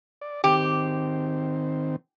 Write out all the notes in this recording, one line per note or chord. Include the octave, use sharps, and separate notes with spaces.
D5
D#3 C4 G4